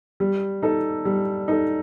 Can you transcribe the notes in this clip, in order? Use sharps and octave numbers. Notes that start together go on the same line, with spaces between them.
G3
D#4 A4
G3
D#4 A4